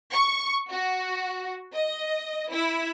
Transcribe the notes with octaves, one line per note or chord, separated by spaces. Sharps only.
C#6
F#4
D#5
E4